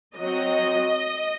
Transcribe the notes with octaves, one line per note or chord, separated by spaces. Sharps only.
F#3 C4 D#5